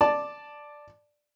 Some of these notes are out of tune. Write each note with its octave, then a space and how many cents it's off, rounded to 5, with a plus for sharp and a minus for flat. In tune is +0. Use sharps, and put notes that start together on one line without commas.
D5 +5 A5 +0